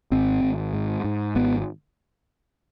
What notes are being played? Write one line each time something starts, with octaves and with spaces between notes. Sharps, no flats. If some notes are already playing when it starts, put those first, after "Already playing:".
G#1 C4
G#1
G#2
G#2
G#1 B3